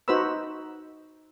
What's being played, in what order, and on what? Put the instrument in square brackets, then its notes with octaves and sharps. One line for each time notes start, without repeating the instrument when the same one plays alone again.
[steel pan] D#4 F#4 B4 C5 B5 E6